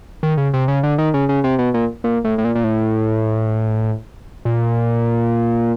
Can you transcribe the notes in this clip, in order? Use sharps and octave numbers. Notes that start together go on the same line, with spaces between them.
D#3
C#3
C3
C#3
D3
D#3
C#3
C#3
C3
B2
A#2
A#2
A2
A2
A#2
A#2
A2
A#2